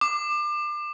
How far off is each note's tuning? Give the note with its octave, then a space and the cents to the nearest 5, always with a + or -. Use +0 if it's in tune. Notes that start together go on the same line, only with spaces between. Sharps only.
D6 +30